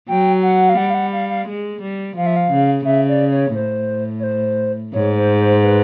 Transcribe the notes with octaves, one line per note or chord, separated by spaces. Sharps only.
F#3 G5
F#5
F5
G3 F#5
F5
F#5
F5
F5
G#3
G3
F3 F5
E5
F5
C#3
C#3 E5
D5
C#5
A2 C5
C#5
C5
G#2 C#5
C5
C5
B4